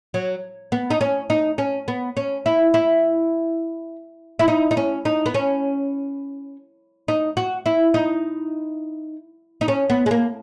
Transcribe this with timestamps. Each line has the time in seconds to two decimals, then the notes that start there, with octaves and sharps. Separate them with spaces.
0.14 F#3
0.72 B3
0.90 D#4
1.01 C#4
1.30 D#4
1.58 C#4
1.88 B3
2.17 C#4
2.46 E4
2.74 E4
4.39 E4
4.48 D#4
4.71 D#4
4.77 C#4
5.05 D#4
5.26 B3
5.34 C#4
7.08 D#4
7.37 F#4
7.66 E4
7.94 D#4
9.61 D#4
9.68 C#4
9.90 B3
10.06 G#3
10.11 A#3